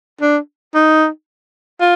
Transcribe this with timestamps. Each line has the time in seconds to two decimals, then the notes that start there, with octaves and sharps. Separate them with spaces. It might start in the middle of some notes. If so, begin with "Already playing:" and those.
0.21 D4
0.75 D#4
1.81 F4